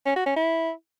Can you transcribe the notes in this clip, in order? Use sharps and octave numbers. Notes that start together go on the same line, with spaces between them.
C#4
F#4
C#4
E4